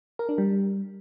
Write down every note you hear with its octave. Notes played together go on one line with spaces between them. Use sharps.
A#4
D4
G3